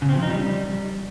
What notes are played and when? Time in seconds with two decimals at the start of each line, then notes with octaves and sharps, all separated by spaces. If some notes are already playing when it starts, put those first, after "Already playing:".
0.02 C#3
0.09 C4
0.16 F3
0.22 D#4
0.29 G3